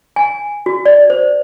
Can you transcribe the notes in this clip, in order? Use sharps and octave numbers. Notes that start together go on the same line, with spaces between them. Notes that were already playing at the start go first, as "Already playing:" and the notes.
G#5
F#4
D5
C5